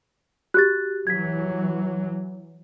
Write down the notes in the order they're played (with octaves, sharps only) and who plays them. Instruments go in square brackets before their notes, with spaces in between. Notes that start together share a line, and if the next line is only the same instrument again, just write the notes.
[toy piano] F#4 G4 [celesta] F#6 A6
[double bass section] E3 F#3 [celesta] G#6 B6